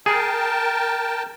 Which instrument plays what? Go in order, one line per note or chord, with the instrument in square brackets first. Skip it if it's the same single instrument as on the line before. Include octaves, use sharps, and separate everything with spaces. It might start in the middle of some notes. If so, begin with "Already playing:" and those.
[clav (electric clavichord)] G#4 [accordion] A#4 G5 A5